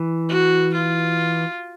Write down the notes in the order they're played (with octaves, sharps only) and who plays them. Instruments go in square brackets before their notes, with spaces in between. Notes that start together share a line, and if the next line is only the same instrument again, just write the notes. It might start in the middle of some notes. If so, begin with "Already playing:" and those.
Already playing: [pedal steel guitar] E3
[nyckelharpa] F#4
F4